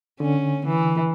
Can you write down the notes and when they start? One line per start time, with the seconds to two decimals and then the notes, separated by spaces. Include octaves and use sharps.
0.20 D3 C#4
0.66 E3